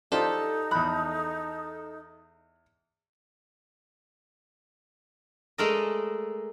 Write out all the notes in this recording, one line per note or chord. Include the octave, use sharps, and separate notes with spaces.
D4 D#4 F4 G4 A4 C5
E2 B5 F#6
G#3 A3 A4 A#4 D5 D#5